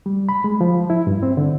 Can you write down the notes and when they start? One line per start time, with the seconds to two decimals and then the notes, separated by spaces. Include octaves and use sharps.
0.06 G3
0.29 B5
0.44 G#3
0.61 F3
0.90 E4
1.07 G2
1.23 C4
1.37 D3